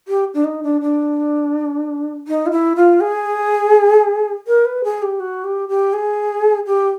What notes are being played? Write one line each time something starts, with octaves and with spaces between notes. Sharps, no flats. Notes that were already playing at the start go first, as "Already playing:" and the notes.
G4
D4
D#4
D4
D4
D#4
F4
E4
F4
G#4
A#4
B4
G#4
G4
F#4
G4
G4
G#4
G4